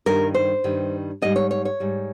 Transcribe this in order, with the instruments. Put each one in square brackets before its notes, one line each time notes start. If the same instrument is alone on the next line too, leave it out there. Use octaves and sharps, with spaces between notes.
[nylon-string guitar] G2 D#3 G3 A#4
C5
G2 D#3 G3
G#2 G3 D#5
C#5
C#5
C#5
G#2 G3